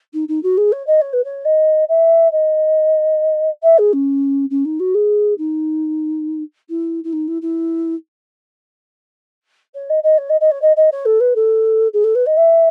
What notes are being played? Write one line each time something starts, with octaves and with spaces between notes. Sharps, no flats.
D#4
D#4
F#4
G#4
C#5
D#5
C#5
B4
C#5
D#5
E5
D#5
E5
G#4
C#4
C#4
D#4
F#4
G#4
D#4
E4
E4
D#4
E4
E4
C#5
D#5
D#5
C#5
D#5
D#5
C#5
D#5
D#5
C#5
A4
B4
A4
G#4
A4
B4
D#5
E5